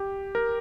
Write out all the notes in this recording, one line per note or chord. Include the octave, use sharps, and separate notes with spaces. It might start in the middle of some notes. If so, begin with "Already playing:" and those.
Already playing: G4
A#4